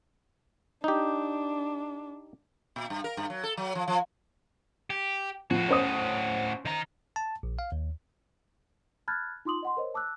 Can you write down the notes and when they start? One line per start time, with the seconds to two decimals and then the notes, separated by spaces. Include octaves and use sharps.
0.84 D4 D#4 G4
2.76 A#2
2.90 G2
3.04 A#4
3.17 G2
3.30 F#3
3.43 A4
3.57 F#3
3.75 F3
3.88 F3
4.90 G4
5.51 A2 F3 F#4
5.69 C#4 C5 D#6
6.65 D#3 A#5
7.16 A5
7.43 A#1
7.59 F5
7.72 D#2
9.08 A5 B5 F6 F#6 G#6 A6
9.45 D#4 F4 C6 D6 D#6 F#7
9.63 D#5 F#5 C6
9.77 A#4 C5 C#5 D#5
9.94 A5 D6 E6 F#6